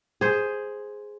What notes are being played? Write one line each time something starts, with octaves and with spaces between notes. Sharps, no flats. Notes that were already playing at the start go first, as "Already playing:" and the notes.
G#4 C5